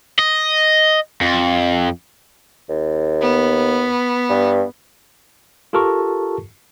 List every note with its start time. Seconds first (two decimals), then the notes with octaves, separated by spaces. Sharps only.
0.19 D#5
1.21 F2
2.69 D#2
3.21 B3
4.30 G2
5.73 F4 G4 A4 A#4 A5 C#6